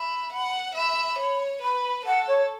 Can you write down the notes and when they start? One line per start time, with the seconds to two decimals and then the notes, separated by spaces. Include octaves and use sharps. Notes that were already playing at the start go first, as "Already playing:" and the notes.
Already playing: E5 B5
0.32 F#5
0.75 E5 B5
1.19 C#5
1.62 B4 B5
2.05 A4 F#5
2.27 C#5